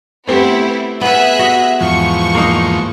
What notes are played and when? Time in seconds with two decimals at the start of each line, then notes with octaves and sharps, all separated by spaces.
0.27 A3 B3 C4 E4 G4
1.01 B3 G#4 B4 E5 F#6
1.39 F#4 D#5
1.81 E2 G#2 F3 C#6
2.35 A#3 D#4